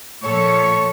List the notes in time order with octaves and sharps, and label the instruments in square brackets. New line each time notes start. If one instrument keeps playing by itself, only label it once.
[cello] A#2 F3 [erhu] A4 [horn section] C#5 [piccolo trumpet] C#6